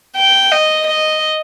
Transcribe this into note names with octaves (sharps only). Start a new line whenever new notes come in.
G5
D#5
D#5